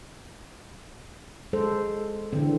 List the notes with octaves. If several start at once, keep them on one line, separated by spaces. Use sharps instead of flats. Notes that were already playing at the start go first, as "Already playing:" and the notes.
G#3 A4 C5
D3 E3 C4